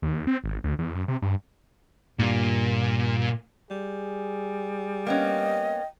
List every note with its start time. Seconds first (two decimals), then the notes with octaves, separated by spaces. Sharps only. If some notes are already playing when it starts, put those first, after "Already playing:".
0.02 D#2
0.27 C4
0.44 G#1
0.64 D2
0.79 E2
0.94 F#2
1.08 C3
1.22 G2
2.19 G2 A#2
3.71 G3 G#4
5.07 A#3 B3 C#4 D#5 G5